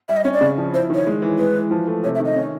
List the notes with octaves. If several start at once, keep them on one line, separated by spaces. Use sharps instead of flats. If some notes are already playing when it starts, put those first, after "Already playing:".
G3 E5
D#5
C#4 C#5
D5
C#3
F3
E4 C5
D#3 C#5
G#3
E3
G#3 B4
E3
F3
A3
C3 C#5
E5
D#3
D#5
C#4